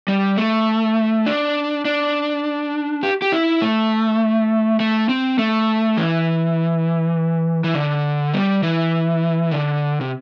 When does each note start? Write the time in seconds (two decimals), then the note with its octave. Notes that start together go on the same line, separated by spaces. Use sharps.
0.08 G3
0.38 A3
1.26 D4
1.85 D4
3.03 G4
3.22 G4
3.32 E4
3.62 A3
4.80 A3
5.09 C4
5.39 A3
5.97 E3
7.64 E3
7.75 D3
8.33 G3
8.63 E3
9.51 D3
10.01 C3